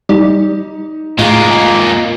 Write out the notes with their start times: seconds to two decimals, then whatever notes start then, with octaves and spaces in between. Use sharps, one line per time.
0.09 G3 D#4
1.19 A2 G#3 A#3 F4